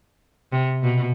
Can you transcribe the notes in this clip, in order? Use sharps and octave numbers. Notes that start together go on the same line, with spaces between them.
C3
B2